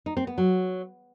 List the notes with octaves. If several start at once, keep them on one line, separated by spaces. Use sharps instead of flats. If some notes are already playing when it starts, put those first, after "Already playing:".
D#4
C4
B3
F#3